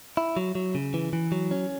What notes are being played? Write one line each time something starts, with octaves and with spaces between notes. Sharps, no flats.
E4
F#3
F#3
C#3
E3
E3
F#3
C#4